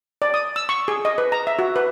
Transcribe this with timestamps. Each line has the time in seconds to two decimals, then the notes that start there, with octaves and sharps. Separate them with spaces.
0.22 D5
0.34 D#6
0.56 E6
0.69 C#6
0.88 G#4
1.05 D#5
1.18 B4
1.32 A#5
1.47 E5
1.59 F#4
1.76 B4